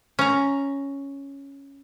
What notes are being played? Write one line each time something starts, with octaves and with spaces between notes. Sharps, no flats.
C#4 A#5